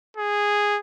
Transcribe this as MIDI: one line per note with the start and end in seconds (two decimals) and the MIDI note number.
0.17 0.79 68